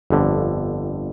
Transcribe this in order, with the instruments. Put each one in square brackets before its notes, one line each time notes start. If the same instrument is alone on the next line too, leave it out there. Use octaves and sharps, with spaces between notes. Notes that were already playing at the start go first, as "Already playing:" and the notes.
[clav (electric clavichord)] G1 F2 D3